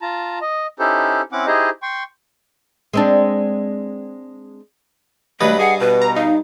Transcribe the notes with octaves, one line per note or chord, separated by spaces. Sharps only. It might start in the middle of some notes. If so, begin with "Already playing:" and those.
F4 A5 A#5
D#5
C#4 D#4 E4 G4 A4 C5
C4 C#4 E4 F#5 D6
D#4 E4 G4 G#4 C5 D#5
G5 C6 C#6
G#3 C4 D4
G2 F#3 A3 B4 D#5
G#4 F#5
B2 B4
A#5
D#4 F5